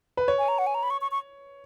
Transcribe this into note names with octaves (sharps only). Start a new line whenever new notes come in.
B4
C#5
G#5
A#5
F#5
G#5
A#5
B5
C#6
C#6
C#6